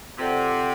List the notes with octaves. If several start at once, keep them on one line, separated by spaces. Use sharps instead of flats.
C3 F4 A4 D5 F#5